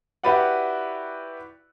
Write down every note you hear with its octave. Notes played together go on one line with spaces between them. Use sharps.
E4 F#4 G4 B4 D5 F#5